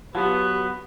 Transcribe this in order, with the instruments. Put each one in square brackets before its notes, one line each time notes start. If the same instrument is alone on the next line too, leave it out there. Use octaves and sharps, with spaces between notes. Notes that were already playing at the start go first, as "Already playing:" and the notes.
[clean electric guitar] F#3 B3 [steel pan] F4 F#5 A5 [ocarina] G4 [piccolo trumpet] B4